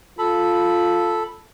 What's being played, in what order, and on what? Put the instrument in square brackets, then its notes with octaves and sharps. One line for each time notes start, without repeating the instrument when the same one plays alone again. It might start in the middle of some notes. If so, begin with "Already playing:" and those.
[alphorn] F4 [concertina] A4 B5